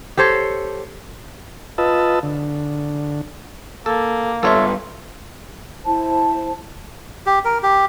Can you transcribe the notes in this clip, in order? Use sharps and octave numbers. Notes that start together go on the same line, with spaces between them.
G4 A4 C5 C#5
F4 B4 D#5 A5 E6
D3
A#3 A4
G2 B3 F4 A4 C#5 E5
E4 C5 A5
G4
A#4
G4